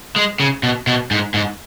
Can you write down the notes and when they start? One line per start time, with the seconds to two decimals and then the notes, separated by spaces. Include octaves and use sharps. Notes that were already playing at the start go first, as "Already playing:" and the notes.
0.16 G#3
0.40 C#3
0.63 B2
0.87 B2
1.11 G#2
1.34 G#2